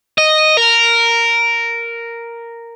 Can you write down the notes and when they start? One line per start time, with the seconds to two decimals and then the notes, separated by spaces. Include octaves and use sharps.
0.18 D#5
0.57 A#4